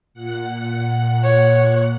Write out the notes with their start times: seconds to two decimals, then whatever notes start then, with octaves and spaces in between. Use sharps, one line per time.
0.14 A#2 F#5
1.24 C#5